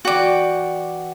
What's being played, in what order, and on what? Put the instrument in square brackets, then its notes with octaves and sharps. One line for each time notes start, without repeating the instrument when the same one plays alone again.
[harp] E3 D5 G5 [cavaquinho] F#4 D6